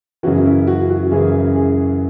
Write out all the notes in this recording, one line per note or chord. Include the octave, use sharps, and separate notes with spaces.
F#2 C#3 E3 F#4
E4
F#4
F#4
F#2 C#3 E3 G#4
G#4